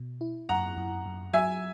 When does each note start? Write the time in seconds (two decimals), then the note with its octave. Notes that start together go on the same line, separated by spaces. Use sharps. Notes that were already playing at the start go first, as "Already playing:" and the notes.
Already playing: B2
0.21 E4
0.49 F#2 F#5 A#5
0.77 F#2
1.06 F#2
1.33 F#3 E5 G#5